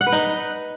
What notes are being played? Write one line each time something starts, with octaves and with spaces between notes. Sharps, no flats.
F#5
B4
D#4